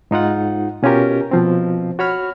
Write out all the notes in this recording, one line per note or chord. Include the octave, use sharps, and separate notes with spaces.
G#2 D#4 F4 F#5
B2 C#4 F4 G4 A#4
B2 F3 C4
F#4 C#5 B5 F6